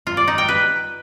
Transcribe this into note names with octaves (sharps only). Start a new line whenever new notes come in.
F4
D5
D#4
G5
B4